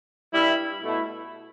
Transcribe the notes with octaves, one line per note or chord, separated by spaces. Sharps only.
G2 G3 E4
B2 A3 E4